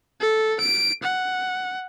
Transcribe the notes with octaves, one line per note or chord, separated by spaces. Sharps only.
A4
D7
F#5